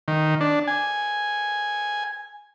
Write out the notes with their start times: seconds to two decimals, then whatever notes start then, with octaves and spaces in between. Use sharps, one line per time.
0.08 D#3
0.41 D4
0.67 G#5